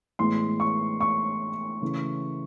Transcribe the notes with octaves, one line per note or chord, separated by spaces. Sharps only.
A2 E3 G#3 B3 C6
C#6
C#6
C#3 E3 A3